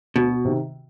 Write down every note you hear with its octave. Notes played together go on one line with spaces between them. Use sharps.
D2 B2
C3 D#3